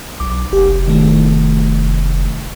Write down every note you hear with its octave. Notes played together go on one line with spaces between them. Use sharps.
B1 D6
F1 G4
D#3 A3